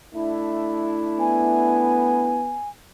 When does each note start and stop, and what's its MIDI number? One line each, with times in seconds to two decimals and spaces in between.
0.14 2.43 57
0.14 2.43 62
0.14 2.43 64
1.20 2.60 59
1.20 2.69 80